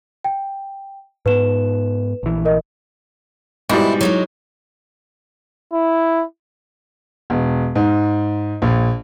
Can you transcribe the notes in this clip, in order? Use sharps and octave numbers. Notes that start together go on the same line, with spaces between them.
G5
G#2 B3 B4 E7
A#1 E3
A#4 D#5
G#2 B2 G3 E4
F#3 G#3 D#4
E4
E1
G#2
A#1